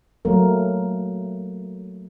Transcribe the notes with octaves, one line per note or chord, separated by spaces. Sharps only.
F#3 A3 A#3 A#4